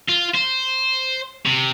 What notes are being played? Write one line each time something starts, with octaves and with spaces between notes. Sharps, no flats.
F4
C5
C3